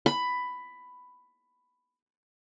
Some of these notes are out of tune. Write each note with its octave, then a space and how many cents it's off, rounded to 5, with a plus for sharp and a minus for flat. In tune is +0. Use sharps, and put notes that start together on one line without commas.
B5 +10